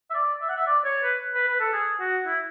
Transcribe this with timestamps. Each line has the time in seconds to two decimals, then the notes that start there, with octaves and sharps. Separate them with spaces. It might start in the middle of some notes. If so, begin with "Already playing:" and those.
0.10 E5
0.14 D5
0.41 E5
0.49 F#5
0.56 E5
0.67 D5
0.84 C#5
1.03 B4
1.34 B4
1.47 B4
1.60 A4
1.73 G#4
2.00 F#4
2.26 E4